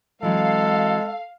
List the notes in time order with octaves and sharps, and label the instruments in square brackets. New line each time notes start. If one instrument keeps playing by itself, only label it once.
[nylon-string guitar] E3 F#3 C4 [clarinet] G#3 [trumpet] A4 [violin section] F5